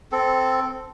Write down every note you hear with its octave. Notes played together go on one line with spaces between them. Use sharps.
C4 A4